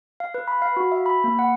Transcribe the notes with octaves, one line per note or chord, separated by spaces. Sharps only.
F5
B4
B5
F5
F#4
E5
B5
A#3
F#5